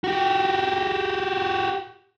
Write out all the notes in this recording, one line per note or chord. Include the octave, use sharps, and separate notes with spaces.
F#4 G4